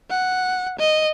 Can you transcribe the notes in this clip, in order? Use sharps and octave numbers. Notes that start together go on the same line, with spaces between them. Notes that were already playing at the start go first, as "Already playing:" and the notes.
F#5
D#5